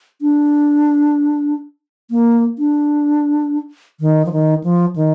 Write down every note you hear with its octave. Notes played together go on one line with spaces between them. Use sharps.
D4
A#3
D4
D#3
F3
D#3
F3
D#3